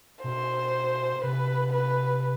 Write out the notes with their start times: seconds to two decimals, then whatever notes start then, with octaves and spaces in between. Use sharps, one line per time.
0.24 B2 C5
1.23 C3 B4
1.73 B4